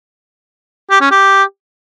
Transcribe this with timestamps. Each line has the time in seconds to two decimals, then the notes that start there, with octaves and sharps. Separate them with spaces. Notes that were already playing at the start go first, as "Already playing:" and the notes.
0.91 G4
1.01 C#4
1.11 G4